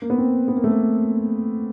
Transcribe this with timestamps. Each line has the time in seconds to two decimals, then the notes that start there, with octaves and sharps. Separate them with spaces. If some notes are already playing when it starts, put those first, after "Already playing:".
0.02 A#3
0.10 B3
0.18 C4
0.48 B3
0.57 A#3
0.64 A3
0.71 A#3